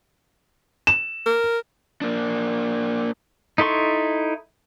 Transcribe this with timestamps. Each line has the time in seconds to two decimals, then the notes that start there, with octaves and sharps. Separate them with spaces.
0.87 E7
1.26 A#4
2.01 A#3 D4
3.58 D#4 E4 A4 C6 C#6